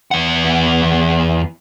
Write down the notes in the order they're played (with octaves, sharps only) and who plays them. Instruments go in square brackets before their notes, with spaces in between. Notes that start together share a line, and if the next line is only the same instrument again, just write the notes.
[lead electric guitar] E2 F#5